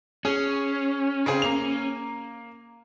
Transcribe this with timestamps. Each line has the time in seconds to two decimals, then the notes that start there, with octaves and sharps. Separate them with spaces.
0.25 C#4 G#4
1.26 C#3 C4 G#4
1.42 A#3 F7